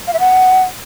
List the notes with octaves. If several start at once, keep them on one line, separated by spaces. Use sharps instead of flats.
F5
E5
F#5